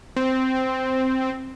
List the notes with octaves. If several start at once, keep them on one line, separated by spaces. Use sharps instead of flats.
C4